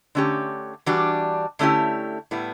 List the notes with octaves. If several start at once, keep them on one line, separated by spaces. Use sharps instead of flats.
D3 A3 C#4 G4
E3 G3 D4 F#4
D3 A3 C#4 E4 G4
A2 G3 B3 E4